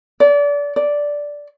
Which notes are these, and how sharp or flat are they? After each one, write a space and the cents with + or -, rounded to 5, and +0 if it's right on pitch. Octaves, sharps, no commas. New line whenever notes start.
D5 -30
D5 -5